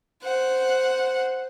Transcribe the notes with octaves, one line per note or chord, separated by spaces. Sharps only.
C5 F#5